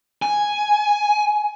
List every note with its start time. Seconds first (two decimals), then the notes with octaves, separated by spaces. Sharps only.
0.22 G#5